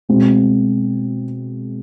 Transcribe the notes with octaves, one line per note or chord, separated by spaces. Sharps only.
B2 G#3 C4